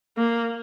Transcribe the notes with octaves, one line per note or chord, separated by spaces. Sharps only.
A#3